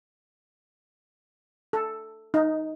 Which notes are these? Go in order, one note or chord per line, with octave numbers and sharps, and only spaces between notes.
A4
D#4